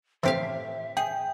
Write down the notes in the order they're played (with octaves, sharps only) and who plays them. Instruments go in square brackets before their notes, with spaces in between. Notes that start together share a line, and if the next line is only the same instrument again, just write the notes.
[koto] A2 G4 F5 [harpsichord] E3 C4 [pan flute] E5
[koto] G#4 [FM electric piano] G5